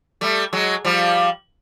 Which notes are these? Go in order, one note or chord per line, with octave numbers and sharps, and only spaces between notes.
G3 A3
F#3 G#3
F3 G3